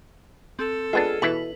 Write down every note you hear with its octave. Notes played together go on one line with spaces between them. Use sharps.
C4 A4
G#3 B3 D4 F4 G#4
B2 E3 E4 B4